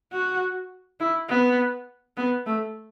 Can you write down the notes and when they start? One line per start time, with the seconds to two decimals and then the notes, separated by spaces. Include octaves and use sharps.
0.12 F#4
1.00 E4
1.29 B3
2.17 B3
2.46 A3